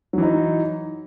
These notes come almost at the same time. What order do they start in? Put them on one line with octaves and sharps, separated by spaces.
F#3 E3 D#4